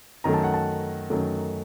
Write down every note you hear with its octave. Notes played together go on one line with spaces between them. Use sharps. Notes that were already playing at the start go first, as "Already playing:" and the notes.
F#2 D#3 F#3 A3 A#5
A5
F#5
A5
F#2 D#3 F#3 A3